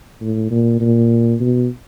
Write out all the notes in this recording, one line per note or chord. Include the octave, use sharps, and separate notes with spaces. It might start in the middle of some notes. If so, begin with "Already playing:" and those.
A2
A#2
A#2
B2